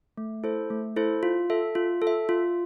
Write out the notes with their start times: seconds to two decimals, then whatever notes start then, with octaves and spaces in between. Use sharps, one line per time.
0.17 A3
0.43 E4 A4 C5
0.70 A3
0.96 E4 A4 C5
1.23 F4
1.50 A4 E5
1.75 F4
2.02 A4
2.07 E5
2.29 F4